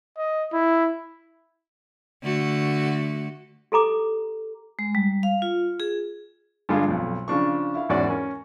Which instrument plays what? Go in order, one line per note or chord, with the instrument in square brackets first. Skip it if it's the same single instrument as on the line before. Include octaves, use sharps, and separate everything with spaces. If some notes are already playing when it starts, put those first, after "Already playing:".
[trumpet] D#5
E4
[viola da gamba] D3 A3 F#4
[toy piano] G4 A4 A#5 D6
[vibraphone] G#3
G3
F5
F4
G#4
[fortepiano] G2 D3 G#3 F4
B1 F2
C#3 F3 D4 C#6
E4 F5
E2 G#2 C#4 F#4 D5
C#4 A#4